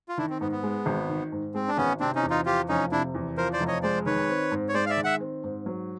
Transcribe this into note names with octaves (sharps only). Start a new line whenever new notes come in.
F4
D#3 D4 E4
C4
G#2 B3
B3
G#3
G#1
D#3
G#2
G#3 C4
D4
G#1 B3 C#4
C3 C4 D4
C#4 D#4
E2
D#4 F4
F3 F4 G4
F1 C#4 D#4
C3 D4 E4
E2
F3 A#4 C5
C5 D5
F1
C#5 D#5
G#3 C5 D5
D#3 B4 C#5
C4
G#2
C#5
G#3 C5 D5
F5
D5 E5
D#3
E5 F#5
C4
G#2
F#3